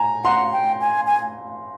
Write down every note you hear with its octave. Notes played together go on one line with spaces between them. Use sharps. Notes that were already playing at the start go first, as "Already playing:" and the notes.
Already playing: G#5 A#5
F#5 A#5 C6
G5
G#5
G#5